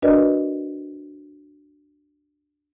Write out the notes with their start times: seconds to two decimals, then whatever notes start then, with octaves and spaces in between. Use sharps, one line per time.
0.02 D4 F#4 A#4 B4 D5 D#5